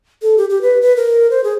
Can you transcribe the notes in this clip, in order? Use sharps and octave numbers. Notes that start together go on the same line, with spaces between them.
A4
G4
G4
B4
B4
A#4
C5
G#4